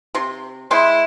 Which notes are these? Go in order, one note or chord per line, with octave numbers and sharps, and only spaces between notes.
C3 C6
G#3 E4 G5 C6